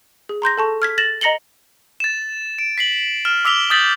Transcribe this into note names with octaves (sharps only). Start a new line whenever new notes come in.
G#4
A#5 C6 G6 A#6
A4 A5 C#6
F6 G#6 B6
A6 A#6 E7 F#7
D#5 A#5 A#6 C#7 F#7 G7
A6 E7
D7
B6 C7 F#7
F6 E7
D6 E6 B6 F7 G7
D#6 E6 G6 A6 B6 F#7